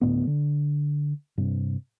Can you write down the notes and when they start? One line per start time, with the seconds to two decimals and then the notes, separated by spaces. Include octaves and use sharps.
0.01 D2 A2 B3
0.27 D3
1.38 G2 C3